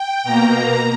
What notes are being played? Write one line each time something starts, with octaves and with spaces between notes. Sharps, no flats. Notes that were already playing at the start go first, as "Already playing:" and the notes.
Already playing: G5
B2 A#3 A#5